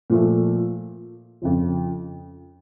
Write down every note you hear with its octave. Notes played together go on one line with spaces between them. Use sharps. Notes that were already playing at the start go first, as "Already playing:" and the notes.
A#2 F3 A3
F2 C#3 F3